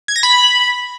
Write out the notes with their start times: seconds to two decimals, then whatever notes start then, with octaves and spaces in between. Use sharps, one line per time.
0.08 G#6
0.16 A#6
0.23 B5